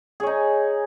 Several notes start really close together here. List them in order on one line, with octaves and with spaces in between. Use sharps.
G#4 C#5 D#4